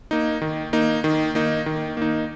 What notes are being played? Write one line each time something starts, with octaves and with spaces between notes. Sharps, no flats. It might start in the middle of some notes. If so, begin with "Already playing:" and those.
A#3 D#4
D#3
A#3 D#4
D#3
A#3 D#4
D#3
A#3 D#4